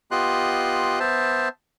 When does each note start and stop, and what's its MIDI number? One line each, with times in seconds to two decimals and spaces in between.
0.11 0.99 59
0.11 0.99 65
0.11 0.99 67
0.11 0.99 75
0.11 0.99 84
0.11 0.99 90
1.00 1.49 59
1.00 1.49 72
1.00 1.49 76
1.00 1.49 81